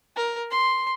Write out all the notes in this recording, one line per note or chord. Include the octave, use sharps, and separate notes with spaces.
A#4
C6